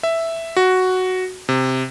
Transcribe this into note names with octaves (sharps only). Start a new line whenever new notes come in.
E5
F#4
C3